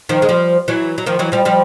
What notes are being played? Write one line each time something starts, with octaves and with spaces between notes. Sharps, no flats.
D#3 F3
G#3
F3 G3
E3 F#3
F#3
D#3 F3
E3 F#3
F3 G3
F3 G3